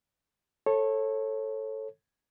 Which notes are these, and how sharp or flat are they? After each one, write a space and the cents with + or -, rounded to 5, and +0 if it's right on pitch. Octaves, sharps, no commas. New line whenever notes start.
A4 +0 C#5 -25